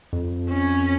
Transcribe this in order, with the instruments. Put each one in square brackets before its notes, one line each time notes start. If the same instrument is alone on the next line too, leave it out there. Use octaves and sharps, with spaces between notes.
[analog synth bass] F2
[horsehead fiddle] C#4